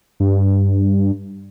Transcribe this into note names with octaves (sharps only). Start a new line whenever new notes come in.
G2